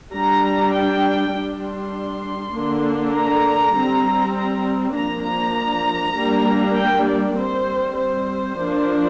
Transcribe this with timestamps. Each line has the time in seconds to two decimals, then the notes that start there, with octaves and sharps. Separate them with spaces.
0.12 G3 D4 A#5
0.72 G5
1.32 G3
1.37 D4
1.62 C6
2.54 D3 A#3 D4
3.13 A#5
3.74 G3 C4
4.34 A#5
4.94 F3 A#3 D4 A#5
5.24 A#5
6.16 G3 A#3 D4
6.76 G5
7.06 D5
7.36 G3 C4 C5
7.97 C5
8.56 F3 A#3 D4